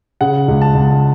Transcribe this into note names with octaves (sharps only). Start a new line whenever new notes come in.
C#3 F#5
C#2
A5
C#2